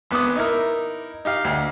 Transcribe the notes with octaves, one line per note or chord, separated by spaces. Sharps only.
G#1 B3 D6 D#6
D#4 E4 A#4
D#4 G4 F5
D2